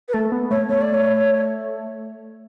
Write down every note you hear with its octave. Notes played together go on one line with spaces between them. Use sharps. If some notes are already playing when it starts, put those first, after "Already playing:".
B4
A3 A4
B3
A3 C#5
A3 C#5
D5
C#5